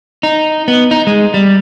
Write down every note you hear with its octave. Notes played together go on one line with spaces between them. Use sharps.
D#4
B3
D#4
G#3
G3